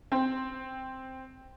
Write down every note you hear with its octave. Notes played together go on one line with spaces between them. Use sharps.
C4